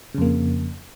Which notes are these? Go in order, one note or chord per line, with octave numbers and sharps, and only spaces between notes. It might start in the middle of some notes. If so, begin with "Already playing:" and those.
F2 C#3 A#3